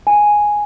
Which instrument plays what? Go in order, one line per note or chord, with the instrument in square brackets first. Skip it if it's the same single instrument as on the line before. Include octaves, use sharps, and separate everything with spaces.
[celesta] G#5